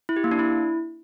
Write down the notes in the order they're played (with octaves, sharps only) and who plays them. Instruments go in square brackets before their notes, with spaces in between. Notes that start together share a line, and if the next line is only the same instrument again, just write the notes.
[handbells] E4
G4
A#3
D4
E4